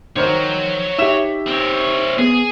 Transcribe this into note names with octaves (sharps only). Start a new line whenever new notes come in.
D#3 C5 C#5 A#5
D#4 G4 E5 E7
C4 C#5
B3 G#4